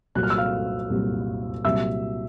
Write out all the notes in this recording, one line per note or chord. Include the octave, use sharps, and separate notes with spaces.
C2 A#2 F#3 F#6
F6
E6
F5 F6
C2 A#2 F#3
C2 A#2 F#3 E5 E6